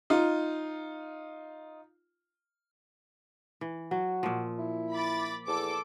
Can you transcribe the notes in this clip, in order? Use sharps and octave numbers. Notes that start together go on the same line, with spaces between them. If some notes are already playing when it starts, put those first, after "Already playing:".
D#4 F4
E3
F#3 F#4
A#2 F3
E4
B5 D6 A6
E2 A4 D6